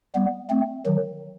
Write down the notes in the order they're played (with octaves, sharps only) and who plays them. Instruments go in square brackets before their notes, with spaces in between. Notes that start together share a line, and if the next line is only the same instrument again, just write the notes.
[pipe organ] G3 B3
A3 C4
D#3 F#3